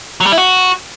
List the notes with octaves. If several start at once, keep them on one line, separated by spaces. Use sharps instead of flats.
F#3
G3
E4
F#4